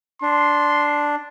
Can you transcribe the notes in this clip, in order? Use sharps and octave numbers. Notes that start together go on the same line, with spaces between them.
D4 C6